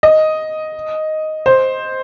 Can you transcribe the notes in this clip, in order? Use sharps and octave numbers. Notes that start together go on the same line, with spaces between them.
D#5
C5